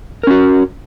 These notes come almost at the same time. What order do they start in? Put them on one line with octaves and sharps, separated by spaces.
A#4 C#4 F#4